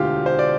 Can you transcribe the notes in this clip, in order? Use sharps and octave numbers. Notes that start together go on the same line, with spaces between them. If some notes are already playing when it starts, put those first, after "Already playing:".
Already playing: E1 D2 D3 F4 G4
C5
D5